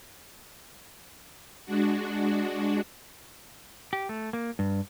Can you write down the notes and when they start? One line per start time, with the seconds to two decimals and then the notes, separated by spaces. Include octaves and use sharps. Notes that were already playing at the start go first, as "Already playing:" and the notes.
1.65 G#3 D4 F#4
3.93 G4
4.09 A3
4.33 A#3
4.59 G2